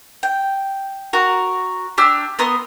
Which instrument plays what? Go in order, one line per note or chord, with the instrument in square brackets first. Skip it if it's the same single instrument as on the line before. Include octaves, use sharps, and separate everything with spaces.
[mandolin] G5
F#4 A#4
D4 G4 E6 F6
B3 A#4 C6 D#6